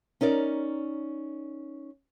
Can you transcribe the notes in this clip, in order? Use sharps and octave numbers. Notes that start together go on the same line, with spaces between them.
C#4 D#4 A#4 D5